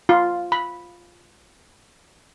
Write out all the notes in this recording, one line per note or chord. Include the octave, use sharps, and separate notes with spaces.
F4
B5